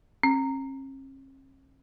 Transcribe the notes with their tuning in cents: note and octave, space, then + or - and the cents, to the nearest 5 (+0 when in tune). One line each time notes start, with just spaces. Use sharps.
C#4 -45